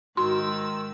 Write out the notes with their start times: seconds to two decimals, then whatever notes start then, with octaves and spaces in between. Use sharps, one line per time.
0.17 G#2 D#3 F#4 C6 E6